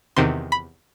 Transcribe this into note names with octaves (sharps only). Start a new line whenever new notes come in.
E2 C3 D#3 C6
B5